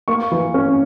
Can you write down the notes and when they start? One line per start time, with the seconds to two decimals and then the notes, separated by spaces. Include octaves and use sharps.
0.08 A#3 C#6
0.32 E3
0.54 C#4